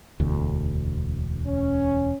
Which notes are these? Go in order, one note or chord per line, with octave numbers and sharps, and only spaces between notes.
E1 D2
C#4